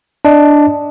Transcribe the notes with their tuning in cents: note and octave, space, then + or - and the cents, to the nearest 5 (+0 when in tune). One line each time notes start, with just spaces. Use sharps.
D4 +0 D#5 +0